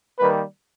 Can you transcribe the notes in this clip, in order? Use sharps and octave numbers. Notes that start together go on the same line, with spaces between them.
D#3 G3 A#3 B4